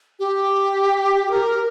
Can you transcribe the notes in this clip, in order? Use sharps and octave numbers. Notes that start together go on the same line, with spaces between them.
G4
G4
A#4